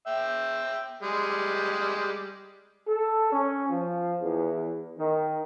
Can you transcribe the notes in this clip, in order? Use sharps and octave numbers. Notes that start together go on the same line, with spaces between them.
E5 G5
G3 G#3
A4
C#4
F3
E2
D#3